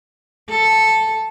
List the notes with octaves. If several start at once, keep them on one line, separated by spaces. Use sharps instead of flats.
A4